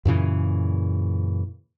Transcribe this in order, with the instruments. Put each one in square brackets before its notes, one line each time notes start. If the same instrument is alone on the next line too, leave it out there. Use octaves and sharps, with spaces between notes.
[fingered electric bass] F#2 A#2 C#3 E3